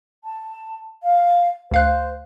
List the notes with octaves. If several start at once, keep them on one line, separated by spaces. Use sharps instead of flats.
A5
F5
D2 C5 F5 F#6